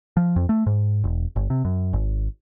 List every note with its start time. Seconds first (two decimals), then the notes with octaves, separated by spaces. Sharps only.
0.17 F3
0.36 F2
0.49 A3
0.66 G#2
1.04 E1
1.36 G1
1.50 C3
1.65 F#2
1.93 G#1